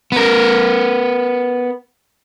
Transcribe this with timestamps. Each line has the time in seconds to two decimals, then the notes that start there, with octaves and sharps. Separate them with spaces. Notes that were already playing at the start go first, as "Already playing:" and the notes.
0.12 B3 A#4